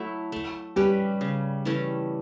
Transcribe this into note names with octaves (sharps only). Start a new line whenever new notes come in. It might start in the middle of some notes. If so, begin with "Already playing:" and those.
Already playing: F#3 A3 E4
A3
G3 C#4 G4 B4
C#3
E3 A3 C#4